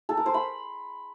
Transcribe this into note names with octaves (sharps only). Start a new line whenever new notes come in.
A4
A#4
C5
B5